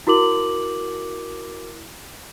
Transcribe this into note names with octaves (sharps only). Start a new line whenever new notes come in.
E4 F#4 A#4 D6 F#7